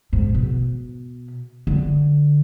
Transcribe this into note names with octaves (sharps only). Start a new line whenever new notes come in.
G#2
B2
D3